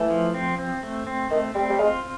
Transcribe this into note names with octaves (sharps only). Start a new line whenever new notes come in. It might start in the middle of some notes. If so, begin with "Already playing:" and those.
Already playing: E3 A3
F3
C4
C4
A3
C4
D#3 A3
G3 C4
G3
G#3 F4